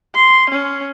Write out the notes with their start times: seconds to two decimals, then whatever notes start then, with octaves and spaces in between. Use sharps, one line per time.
0.15 C6
0.50 C#4